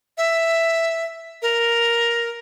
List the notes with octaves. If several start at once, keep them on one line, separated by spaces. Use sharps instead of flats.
E5
A#4